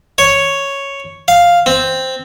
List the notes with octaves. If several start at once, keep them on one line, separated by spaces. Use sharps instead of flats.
C#5
F5
C4